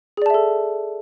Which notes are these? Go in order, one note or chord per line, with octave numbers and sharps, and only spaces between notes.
G#4 A4 D5 E5 A5